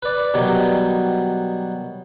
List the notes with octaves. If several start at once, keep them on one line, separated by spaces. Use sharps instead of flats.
B4 D5
B2 D#3 F#3 G3